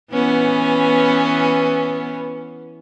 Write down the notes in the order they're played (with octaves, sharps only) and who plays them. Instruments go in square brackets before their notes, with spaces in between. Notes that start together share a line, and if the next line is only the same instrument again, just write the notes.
[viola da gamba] E3 B3 C#4